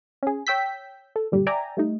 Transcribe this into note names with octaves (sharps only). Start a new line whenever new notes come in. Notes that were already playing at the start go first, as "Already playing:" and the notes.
C#4 G#4
C#5 G5 E6 G6 B6
A4
G1 A#2 D3 G3 G4
D5 E5 G5 G#5 A#5
G3 A3 D#4